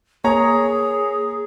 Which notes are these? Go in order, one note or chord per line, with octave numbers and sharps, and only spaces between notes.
A#3 G#4 C#5 G#5 A#5